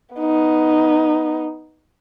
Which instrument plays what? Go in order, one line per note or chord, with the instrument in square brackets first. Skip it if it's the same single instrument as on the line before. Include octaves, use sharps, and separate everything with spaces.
[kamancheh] B3 D#4